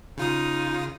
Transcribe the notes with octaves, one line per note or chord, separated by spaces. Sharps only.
C#3 D#4 F4 D#6